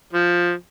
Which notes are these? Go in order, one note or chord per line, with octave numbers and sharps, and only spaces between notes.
F3